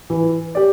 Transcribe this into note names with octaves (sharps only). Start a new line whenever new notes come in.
E3
G4 D5